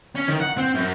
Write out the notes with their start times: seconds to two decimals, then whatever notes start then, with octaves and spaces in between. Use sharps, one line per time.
0.16 C#4
0.29 D#3
0.41 F#5
0.58 C4
0.75 F#2